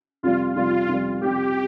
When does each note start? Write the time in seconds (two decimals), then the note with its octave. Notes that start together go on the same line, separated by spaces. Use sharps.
0.23 F2 C3 G3 F4
0.56 F2 C3 G3 F4
0.89 F2 C3 G3
1.21 F2 C3 G3 G4